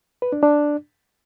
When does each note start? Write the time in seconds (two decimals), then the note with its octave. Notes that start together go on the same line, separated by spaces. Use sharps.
0.22 B4
0.32 D4
0.43 D4